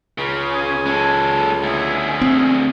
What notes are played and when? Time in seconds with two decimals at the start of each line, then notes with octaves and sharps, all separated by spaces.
0.18 C#2 C#3
0.51 G#5
0.86 G#3 A4
1.63 D2 G#4 E5
2.22 C4